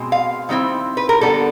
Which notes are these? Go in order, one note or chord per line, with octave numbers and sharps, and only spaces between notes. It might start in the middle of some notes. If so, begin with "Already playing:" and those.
Already playing: B2 G#3 C4
F5
D#3 G3 C4 E4
B4
A#4
D3 G3 B3 A4